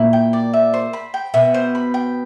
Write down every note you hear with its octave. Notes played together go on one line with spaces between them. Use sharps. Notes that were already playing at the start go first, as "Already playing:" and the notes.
Already playing: A#2 A#3 E4
G5
D5
E5
C5
B5
G5
B2 B3 E5
C5
B5
G5